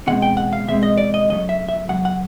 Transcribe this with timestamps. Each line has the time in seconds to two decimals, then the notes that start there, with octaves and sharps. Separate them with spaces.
0.07 E2 B2 G#3 C4 F#5
0.22 G5
0.37 F#5
0.53 F5
0.67 E2 B2 G#3 C4 E5
0.83 D#5
0.98 D5
1.14 D#5
1.29 F#2 C#3 F#3 A3 D#5
1.49 E5
1.69 E5
1.89 F#2 C#3 F#3 F#5
2.05 F#5